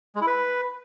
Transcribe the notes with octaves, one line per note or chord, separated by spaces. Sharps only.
G#3
E4
B4